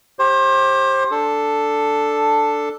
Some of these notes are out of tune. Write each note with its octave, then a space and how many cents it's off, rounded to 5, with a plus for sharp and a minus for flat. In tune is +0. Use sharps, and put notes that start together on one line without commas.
G4 +0 C5 +30
D4 +0 A4 +0